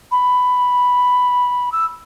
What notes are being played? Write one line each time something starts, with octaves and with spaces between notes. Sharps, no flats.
B5
E6